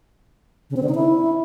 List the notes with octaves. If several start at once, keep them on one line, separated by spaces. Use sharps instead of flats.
C#3
C4
D3
D#4
E4